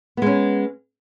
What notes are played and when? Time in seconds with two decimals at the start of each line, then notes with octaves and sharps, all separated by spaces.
0.17 B3
0.22 G#3
0.26 C#4